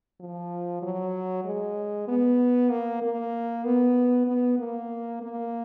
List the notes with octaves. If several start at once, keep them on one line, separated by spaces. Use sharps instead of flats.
F3
F#3
G#3
B3
A#3
A#3
B3
B3
A#3
A#3